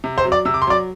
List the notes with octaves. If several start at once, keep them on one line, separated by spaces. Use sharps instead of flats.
C3
C5 C6
F#3
D5 D6
C3 E6
D6
C6
F#3 D5 D6